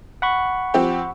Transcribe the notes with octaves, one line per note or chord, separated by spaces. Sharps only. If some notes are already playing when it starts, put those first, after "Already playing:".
F#5 B5 C#6
F3 C4 G4